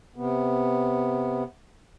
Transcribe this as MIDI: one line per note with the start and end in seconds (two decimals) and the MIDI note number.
0.16 1.44 48
0.16 1.44 59